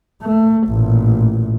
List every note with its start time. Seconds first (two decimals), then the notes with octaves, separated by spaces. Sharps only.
0.22 A3
0.68 A1 A#2